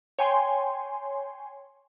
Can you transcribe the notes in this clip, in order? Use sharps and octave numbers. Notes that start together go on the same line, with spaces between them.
C#5 G5 G#5 C6